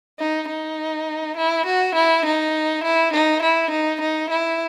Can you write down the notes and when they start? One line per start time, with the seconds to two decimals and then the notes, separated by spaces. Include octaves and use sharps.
0.19 D#4
0.49 D#4
1.37 E4
1.66 F#4
1.95 E4
2.26 D#4
2.84 E4
3.13 D#4
3.42 E4
3.71 D#4
4.01 D#4
4.30 E4